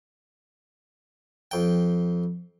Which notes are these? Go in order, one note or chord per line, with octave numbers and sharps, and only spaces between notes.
F2 G5